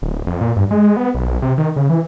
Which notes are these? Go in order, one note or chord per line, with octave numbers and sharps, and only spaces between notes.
D1
F2
A#2
G2
G#3
B3
B1
C3
D#3
C#3
E3